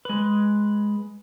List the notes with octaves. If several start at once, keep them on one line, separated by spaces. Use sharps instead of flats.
G#3 B4